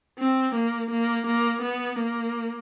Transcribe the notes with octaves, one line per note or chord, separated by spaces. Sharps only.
C4
A#3
A#3
A#3
B3
A#3